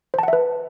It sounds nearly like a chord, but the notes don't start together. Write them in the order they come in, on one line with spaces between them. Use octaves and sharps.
C5 A5 F#5 E5 B4